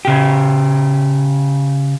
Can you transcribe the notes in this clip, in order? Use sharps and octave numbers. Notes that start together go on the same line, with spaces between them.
C#3 G4